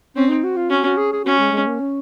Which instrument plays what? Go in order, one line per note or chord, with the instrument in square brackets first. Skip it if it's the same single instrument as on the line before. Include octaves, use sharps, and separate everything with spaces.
[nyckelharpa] C4 [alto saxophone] C#4
[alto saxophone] D#4
F#4
F4
[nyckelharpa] C#4 [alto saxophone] F#4
[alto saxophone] F#4
G#4
G#4
[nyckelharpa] C#4 [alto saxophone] F#4
[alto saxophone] G#3
G#3
A#3
C#4